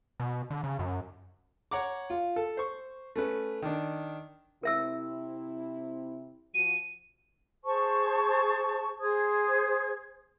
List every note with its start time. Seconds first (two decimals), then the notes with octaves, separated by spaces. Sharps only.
0.20 B2
0.51 D3
0.64 C#3
0.79 F#2
1.71 C#5 F#5 A#5 D6
2.10 F4
2.36 A4
2.57 C5 C#6
3.16 A3 C#4 B4
3.62 D#3 D4
4.63 C3 C4 E4 A#4 E5 E6
6.54 F3 F#4 D#7
7.64 G#4 C5 A5 C#6
9.01 G#4 C5 D#6 G#6